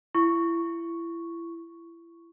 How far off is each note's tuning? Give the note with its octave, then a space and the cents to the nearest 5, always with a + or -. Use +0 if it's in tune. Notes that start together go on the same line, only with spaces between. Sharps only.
E4 +30 C#6 +0